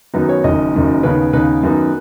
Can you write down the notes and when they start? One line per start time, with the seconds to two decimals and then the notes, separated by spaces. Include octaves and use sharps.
0.14 F#2 D#3 F#3 B3 D#4
0.29 C#5
0.44 F#1 F#2 D#3 D#5
0.73 F#1 F#2 D#3
1.03 D#2 C#3 B3 D#4 B4
1.33 D#2 C#3 B3 D#4 B4
1.63 F#2 D#3 B3 D#4